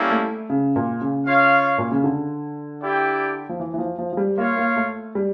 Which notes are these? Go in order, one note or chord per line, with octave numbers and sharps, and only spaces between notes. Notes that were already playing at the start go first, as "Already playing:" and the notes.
Already playing: G3 A#3 C#4 E4 A4
A3
C#3
A#2
C#3
F4 C#5 F5
A#2
C#3
D3
E4 G4 D5 G5
F3
E3
E3
F3
F3
F3
G3
A#3 F4 C#5 F5
A#3
A3
G3